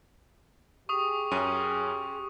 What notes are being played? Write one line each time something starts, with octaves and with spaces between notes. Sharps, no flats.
G4 G#4 C#6 D#6
F#2 C#4 D#7